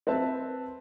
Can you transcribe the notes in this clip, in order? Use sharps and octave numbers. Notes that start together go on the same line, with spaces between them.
C4 B4 E5 A5